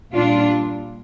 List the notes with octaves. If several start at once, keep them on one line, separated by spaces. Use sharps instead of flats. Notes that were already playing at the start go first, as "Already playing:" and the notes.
A#2 G3 D4 F4